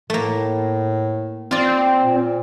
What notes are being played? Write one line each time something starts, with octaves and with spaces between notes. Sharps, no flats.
A2 A3 A#3
C4 F4 D5
A#2